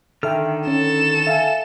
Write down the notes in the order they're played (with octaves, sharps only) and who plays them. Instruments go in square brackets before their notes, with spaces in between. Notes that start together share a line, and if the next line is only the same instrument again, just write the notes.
[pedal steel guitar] D3 D#3 F6 [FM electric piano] A4 E5 G5
[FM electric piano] C#4 [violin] A4 E7
[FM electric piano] E5 F5 G#5